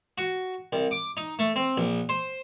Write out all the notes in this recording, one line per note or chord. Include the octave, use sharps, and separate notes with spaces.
F#4
C2
D6
D#4
A3
C4
A#1
C5